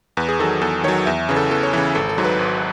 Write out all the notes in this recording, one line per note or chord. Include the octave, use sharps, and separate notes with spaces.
E2 B4
G#4
D#3 F#3 A4
E2 A4
D#3 F#3 C#5
E2 E5
C#3 E3
A4
E2 A4
C#5
C#3 E3 B4
G#1 A4
A4
G#2 F#3
B4
G#1